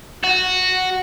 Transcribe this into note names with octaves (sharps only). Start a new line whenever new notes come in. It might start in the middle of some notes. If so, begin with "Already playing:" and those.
F#4